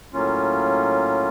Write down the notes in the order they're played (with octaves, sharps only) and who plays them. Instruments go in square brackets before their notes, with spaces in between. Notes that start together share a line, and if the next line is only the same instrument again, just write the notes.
[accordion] A2 F#3 A#3 C#4 F4